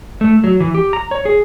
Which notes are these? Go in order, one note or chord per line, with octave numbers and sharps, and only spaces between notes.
A3
F#3
E3
G4
A#5
C#5
G#4